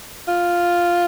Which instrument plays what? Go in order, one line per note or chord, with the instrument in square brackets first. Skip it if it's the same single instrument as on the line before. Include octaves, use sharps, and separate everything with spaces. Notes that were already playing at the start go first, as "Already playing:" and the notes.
[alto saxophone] F4